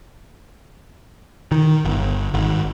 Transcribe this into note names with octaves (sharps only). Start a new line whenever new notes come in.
D#3
G1
G#1